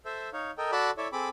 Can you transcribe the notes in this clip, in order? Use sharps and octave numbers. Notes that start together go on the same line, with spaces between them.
A4 C5 E5
D#4 C#5 F5
A4 A#4 D#5 G5
F#4 A4 D5 A5 B5
E4 A4 C#5 D5 E5
C4 G#4 A4 B5 D6